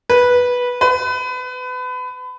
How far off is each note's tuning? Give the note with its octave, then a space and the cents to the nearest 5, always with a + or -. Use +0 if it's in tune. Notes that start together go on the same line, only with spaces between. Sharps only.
B4 -10
B4 +30